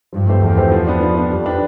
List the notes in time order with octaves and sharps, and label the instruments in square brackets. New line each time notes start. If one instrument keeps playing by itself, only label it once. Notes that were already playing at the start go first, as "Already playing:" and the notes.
[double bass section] G2 [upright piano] F3
[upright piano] A3 C4 G4 C5
[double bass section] E2 [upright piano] F3
[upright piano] A3 C4 G4 C5
F3
B3 D4
F3
B3 D4
[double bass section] F2 [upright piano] G3
[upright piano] D4 G4 B4